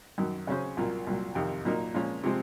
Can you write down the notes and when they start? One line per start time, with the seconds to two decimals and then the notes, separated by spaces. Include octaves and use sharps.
0.18 F#2 D#3 F#3
0.47 C#3 F#3 C#4 G#4 C5
0.77 C2 A#2 F#3 A#3 F4
1.07 C2 A#2 F#3
1.35 F2 C3 D#3
1.65 A#2 F#3 A#3 D#4 A#4
1.94 A#2 F3 G#3 C#4 F4
2.23 C3 F3 G#3 C4